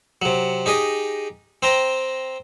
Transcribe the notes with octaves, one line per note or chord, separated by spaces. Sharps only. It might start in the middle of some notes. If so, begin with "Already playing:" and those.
C3 F#3
D#4 G4 G#4 D#5
C4 C5 G5 A#5